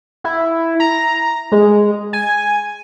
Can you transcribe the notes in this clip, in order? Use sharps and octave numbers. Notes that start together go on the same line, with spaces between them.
E4
A#5
G#3
G#5